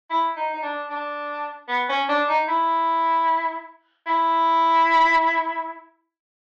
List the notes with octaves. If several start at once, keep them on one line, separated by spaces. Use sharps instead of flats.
E4
D#4
D#4
D4
D4
B3
C#4
D4
D#4
E4
E4